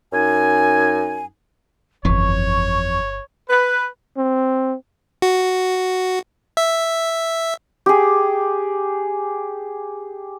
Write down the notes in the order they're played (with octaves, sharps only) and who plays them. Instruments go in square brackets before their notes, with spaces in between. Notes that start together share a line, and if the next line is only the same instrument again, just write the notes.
[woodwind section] F#2 D#4 G#5
[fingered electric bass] D1 G1 [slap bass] F2 E3 [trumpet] C#5 [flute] C#6
[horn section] B4
[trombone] C4
[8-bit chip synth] F#4
E5
[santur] G4 G#4